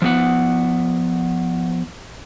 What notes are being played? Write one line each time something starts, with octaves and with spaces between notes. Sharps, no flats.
F3 B3 F#5